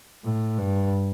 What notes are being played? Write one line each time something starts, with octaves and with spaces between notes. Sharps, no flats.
A2
G2